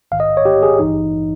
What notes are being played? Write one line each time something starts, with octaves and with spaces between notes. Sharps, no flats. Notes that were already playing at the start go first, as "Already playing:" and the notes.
A#1 G#2 D#3 F5
D#5
C#5
G4
G#4
G#1 G2 E3 D#4